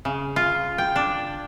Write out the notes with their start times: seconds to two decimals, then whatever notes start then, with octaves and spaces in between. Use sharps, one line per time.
0.05 C#3
0.36 F4
0.78 G5
0.96 D4